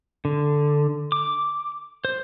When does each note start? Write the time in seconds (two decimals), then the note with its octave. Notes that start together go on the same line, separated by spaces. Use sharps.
0.25 D3
1.12 D6
2.05 C5